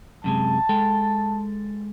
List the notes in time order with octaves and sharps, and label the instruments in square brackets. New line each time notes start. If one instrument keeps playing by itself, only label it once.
[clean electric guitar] F#2 C3 G#3 [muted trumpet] A5
[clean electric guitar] G#3 A4 G5